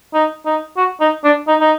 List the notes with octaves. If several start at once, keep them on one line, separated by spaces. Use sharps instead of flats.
D#4
D#4
F#4
D#4
D4
D#4
D#4